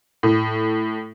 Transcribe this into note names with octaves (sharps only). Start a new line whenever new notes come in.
A2